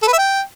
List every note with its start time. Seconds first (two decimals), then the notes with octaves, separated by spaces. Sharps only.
0.03 A4
0.08 B4
0.13 E5
0.18 G5